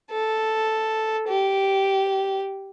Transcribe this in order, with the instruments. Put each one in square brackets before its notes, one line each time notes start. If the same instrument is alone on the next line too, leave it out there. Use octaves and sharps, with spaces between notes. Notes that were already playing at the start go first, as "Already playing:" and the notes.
[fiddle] A4
G4